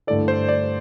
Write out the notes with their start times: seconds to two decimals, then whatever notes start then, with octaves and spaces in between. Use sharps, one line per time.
0.07 G2 D3 A3 E4 A4 D5
0.28 C5
0.49 D5